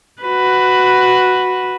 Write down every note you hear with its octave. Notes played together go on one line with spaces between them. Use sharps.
F#4 B4